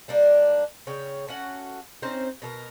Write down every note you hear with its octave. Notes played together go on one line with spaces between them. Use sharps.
G3 A#3 D4
C#3 C#5 G5
A3 C#4 F#4 F#5
C4 C#4 D#4 C5
B2 A4 A#4